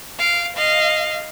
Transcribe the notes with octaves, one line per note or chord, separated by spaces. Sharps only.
F5 D7
D#5 F5